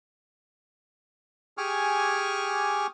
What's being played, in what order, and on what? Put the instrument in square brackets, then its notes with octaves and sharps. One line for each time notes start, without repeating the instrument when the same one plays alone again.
[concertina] G4 G#4 G#5 C#6 D6 F6